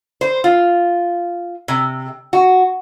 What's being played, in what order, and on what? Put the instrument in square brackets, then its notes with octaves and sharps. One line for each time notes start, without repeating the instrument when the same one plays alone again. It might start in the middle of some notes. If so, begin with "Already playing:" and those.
[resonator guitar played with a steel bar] C5
F4
C3
F#4